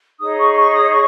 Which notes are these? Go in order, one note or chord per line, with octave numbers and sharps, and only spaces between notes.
D#4 G#4 C#5 D#6
C#6
C#6
D#6
C#6